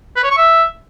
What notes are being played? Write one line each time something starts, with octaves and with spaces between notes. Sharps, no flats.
B4
C#5
C#6
E5